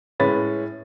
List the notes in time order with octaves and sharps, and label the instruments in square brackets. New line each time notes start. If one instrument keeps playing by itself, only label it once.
[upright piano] A2 G#3 C#4 B4 B5 A6